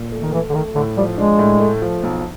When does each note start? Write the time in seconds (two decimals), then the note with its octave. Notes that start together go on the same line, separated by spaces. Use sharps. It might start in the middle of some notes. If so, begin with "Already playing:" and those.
Already playing: A#2
0.12 A3
0.22 D#3
0.32 E3 A3
0.49 D3
0.53 D#3 A3
0.75 A2 D3
0.97 F3 G3
1.18 G#3 D4
1.39 A2
1.60 A3
1.82 F3
2.03 B1